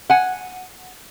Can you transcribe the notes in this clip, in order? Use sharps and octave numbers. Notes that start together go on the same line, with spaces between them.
F#5 G#5